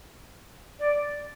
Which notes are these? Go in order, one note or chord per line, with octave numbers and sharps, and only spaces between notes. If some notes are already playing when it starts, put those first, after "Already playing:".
D5